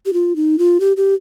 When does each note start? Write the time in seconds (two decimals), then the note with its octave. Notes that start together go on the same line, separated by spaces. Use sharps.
0.06 G4
0.13 F4
0.36 D#4
0.59 F4
0.80 G4
0.97 G4